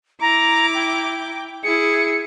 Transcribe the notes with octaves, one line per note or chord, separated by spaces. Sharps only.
E4 A#5 D6
G5
E4 G#4 C#7